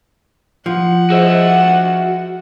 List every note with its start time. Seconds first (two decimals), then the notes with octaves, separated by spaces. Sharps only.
0.66 F3 F#5
1.10 F#4 G#4 C5 D#5 E5